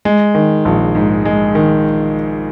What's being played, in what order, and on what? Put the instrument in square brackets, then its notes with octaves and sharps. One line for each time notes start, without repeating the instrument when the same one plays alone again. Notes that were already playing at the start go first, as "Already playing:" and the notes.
[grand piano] G#3
D#3
A#1
G#2
G#3
D#3